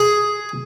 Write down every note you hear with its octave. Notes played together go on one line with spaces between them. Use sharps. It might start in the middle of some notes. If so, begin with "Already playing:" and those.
Already playing: G#4